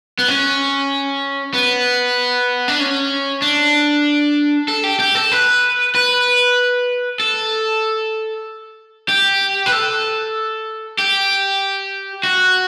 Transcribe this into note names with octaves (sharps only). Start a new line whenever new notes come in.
B3
C#4
B3
D4
C#4
D4
A4
G4
G4
A4
B4
B4
A4
G4
B4
A4
G4
F#4